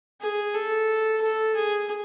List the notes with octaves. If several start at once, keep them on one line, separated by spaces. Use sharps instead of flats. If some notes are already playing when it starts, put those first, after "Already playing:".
G#4
A4
A4
G#4